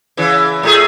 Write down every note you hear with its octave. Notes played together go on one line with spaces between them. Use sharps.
C#3 E3
A2 A3 G#4